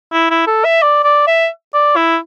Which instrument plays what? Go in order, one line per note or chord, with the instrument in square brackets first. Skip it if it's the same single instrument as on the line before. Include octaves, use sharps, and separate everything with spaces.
[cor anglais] E4
E4
A4
E5
D5
D5
E5
D5
E4